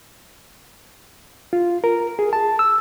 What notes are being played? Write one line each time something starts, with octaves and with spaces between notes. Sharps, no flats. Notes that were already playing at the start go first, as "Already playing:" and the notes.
F4
A#4
G#4
A5
E6